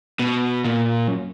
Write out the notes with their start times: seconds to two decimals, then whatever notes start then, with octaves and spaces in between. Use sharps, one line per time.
0.19 B2
0.64 A#2
1.08 F#2